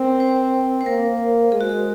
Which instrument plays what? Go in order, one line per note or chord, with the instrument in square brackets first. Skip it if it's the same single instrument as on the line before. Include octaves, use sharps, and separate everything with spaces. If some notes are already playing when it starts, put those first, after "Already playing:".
Already playing: [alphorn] C4 [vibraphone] A#4
[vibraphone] C5
C5
[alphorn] A#3 [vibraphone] A#4
[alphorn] G#3 [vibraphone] G#4
[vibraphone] F#4
G#4